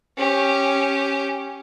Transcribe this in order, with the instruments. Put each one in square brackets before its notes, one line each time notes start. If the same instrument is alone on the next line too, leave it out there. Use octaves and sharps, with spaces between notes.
[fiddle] C#4 G4